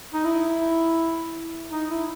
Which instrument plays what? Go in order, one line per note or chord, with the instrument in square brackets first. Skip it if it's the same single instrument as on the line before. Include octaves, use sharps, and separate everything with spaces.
[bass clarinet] D#4
E4
D#4
E4